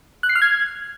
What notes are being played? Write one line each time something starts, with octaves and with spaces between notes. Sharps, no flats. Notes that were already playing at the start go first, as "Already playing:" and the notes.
F#6
C7
F6
G#6